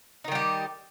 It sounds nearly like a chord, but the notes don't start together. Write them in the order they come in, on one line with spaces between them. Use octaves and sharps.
D#4 D#3 G3 G4